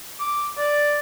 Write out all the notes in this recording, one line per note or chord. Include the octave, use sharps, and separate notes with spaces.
D6
D5